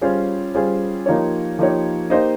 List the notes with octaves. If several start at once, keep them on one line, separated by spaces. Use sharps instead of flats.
G3 C#4 F4 G#4 C5
G3 C#4 F4 G#4 C5
F3 A#3 D#4 G4 C#5
F3 A#3 D#4 G4 C#5
A#3 D#4 G4 C5 D#5